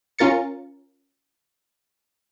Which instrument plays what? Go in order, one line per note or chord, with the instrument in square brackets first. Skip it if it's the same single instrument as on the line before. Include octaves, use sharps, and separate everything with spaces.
[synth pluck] C#4 F4 A#4 A6 C#7